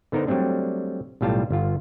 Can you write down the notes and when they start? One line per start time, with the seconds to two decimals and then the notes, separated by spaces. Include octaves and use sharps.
0.12 D3 B3 D#4 A#4 C5
0.27 F#3 G3 A3 C4 D4
1.21 B1 A2 G3 F4 A5
1.51 G1 F4